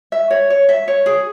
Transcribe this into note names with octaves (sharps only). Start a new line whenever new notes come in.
E5
C#5
C#5
E5
C#5
G#4